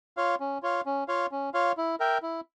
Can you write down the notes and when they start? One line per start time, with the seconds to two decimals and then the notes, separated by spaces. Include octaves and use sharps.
0.17 F4 C#5 F5
0.40 C#4
0.63 F4 C#5 F5
0.86 C#4
1.08 F4 C#5 F5
1.31 C#4
1.54 F4 C#5 F5
1.77 E4
2.00 A#4 E5 G5
2.22 E4